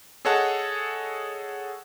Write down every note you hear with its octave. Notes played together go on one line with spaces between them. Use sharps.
G#4 A4 C#5 D#5 F#5 A5